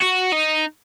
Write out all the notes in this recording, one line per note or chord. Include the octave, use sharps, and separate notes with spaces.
F#4
D#4